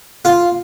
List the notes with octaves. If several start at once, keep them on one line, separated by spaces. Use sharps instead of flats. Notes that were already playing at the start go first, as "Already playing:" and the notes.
F4